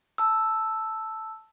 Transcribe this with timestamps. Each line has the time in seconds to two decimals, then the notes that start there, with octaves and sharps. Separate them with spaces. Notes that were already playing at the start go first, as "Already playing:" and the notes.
0.18 A5 E6